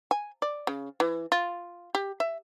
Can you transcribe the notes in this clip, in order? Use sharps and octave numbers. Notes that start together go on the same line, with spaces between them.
G#5
D5
C#3
E3
F4
G4
E5